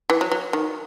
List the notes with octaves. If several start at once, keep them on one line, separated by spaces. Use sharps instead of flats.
E3
F#3
F#3
D#3